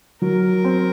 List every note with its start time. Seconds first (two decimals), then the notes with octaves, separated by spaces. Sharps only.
0.22 F#3 A#4
0.64 C4